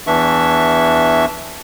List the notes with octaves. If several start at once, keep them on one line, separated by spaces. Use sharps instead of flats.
E2 E3 D4 E5 C#6